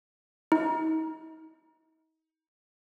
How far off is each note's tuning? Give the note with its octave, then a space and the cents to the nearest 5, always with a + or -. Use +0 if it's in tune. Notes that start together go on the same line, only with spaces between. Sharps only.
D#4 +40